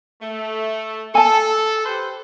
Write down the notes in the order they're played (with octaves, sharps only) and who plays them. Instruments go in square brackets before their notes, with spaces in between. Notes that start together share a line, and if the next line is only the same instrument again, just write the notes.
[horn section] A3
[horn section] A4 [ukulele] G#5 A5
[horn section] G4 B4 C5